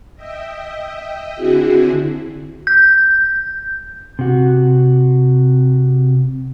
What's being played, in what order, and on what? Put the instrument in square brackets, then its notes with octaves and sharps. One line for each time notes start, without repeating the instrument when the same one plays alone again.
[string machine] D#5 E5 G5
D3 C4 E4 F#4 G#4
[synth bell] G6
[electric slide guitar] C3 F#4